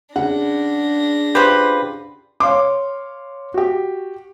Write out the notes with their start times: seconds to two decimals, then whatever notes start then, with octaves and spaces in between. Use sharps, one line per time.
0.16 C#3 D4 F#5 A#6
1.35 F4 G4 B4 C5
2.40 C#5 F5 C6 D6
3.54 F#4 G4